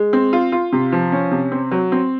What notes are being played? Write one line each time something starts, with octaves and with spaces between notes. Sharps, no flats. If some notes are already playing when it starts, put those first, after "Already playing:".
Already playing: G#3
C4
F4
F4
C3
F3
C#4
C3
C4
F#3
C4